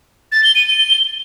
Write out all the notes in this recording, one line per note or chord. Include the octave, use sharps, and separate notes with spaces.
A6
G7
D#7
G7